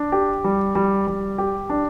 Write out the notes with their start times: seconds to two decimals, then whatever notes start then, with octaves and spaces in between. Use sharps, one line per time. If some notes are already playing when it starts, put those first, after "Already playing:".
Already playing: D4
0.12 G4
0.44 G3
0.75 G3
1.07 G3
1.38 G4
1.70 D4